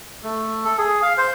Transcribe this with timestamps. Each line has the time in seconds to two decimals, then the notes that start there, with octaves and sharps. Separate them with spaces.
0.23 A3
0.65 A4
0.78 G#4
1.02 F5
1.18 C5